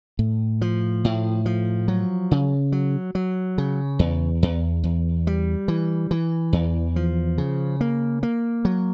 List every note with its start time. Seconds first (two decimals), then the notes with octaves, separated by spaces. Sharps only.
0.19 A2
0.61 F3
1.05 A2
1.46 F3
1.88 F#3
2.31 C#3
2.72 F#3
3.15 F#3
3.58 C#3
3.99 E2
4.43 E2
4.84 E2
5.27 G3
5.68 E3
6.11 E3
6.53 E2
6.96 F3
7.38 C#3
7.81 A#3
8.23 A#3
8.65 F#3